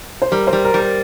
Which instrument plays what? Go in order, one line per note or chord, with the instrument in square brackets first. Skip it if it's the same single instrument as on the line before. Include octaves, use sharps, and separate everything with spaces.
[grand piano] C5
[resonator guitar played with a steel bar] G3 [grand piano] A#4
[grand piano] C5
[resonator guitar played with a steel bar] G3
[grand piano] A#4
[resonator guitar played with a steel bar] G3
[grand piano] A#4